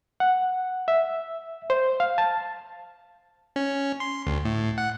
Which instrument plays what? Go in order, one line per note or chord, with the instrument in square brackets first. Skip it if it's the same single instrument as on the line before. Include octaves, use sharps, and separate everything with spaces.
[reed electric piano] F#5
E5
C5
F5
A5
[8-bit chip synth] C#4
C6
D2
A2
F#5